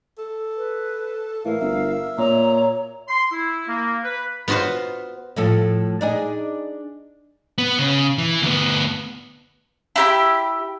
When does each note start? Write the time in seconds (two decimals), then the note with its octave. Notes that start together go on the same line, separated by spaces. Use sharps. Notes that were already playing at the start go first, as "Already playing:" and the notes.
0.18 A4
0.57 B4
1.45 A2 E3 A#4 F5
1.61 G1 E5
2.18 A#2 C#5 A#5
3.08 C6
3.32 E4
3.68 A#3
4.03 B4
4.48 B3 F4 F#4 B4 C5
5.36 A2 F3 A4
6.01 D4 D#4 G#4
7.58 B3
7.79 C#3
8.18 E3
8.42 D2 B3
9.96 E4 G4 B5